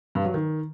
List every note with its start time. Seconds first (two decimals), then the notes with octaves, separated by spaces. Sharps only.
0.15 G2
0.25 F#3
0.34 D#3